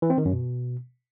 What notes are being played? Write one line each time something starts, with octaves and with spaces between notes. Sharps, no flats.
E3
C4
D#3
F#2
B2